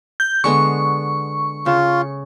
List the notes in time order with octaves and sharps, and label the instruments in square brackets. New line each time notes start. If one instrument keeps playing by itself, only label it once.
[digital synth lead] G6
[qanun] D3 G#3 B3 [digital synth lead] C#6
[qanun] C#3 [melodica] F4